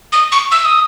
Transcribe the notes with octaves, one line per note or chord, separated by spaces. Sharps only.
D#6
C#6
E6
D#6